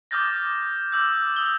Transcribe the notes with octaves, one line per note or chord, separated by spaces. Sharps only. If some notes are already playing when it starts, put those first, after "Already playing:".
D6 D#6 F6 G6 A6 A#6
D6 E6 G6
D#6 E6 G7